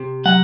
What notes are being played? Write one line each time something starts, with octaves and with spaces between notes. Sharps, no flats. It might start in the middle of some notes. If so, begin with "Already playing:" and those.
Already playing: C3
F#3 F#5